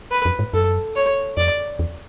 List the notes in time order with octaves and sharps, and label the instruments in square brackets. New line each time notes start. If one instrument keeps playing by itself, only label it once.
[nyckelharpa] B4
[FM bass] F2
G#2
[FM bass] F#2 [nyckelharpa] A4
[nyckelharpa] C#5
[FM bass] F2 [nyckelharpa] D5
[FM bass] E2